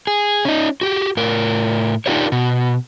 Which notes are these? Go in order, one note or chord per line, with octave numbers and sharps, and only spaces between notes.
G#4
C#4 D#4
F#4 G4
A2 A#4
D4 D#4 F4 G4 A#4 C#5
B2